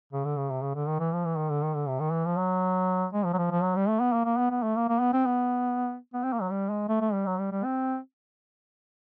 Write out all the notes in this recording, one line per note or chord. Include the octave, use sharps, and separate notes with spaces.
C#3
D3
C#3
C3
C#3
D3
D#3
E3
F3
E3
D#3
D3
D#3
D3
C3
D#3
E3
F3
F#3
G#3
F3
F#3
F3
F3
F#3
G3
A3
B3
A#3
A#3
B3
B3
A3
A#3
A#3
B3
C4
B3
B3
C4
A#3
F#3
G3
G#3
A3
A3
G3
F#3
G3
G3
C4